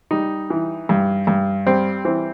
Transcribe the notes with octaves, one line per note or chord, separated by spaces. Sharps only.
G3 D#4
E3
G2
G2
G3 C4
E3 C4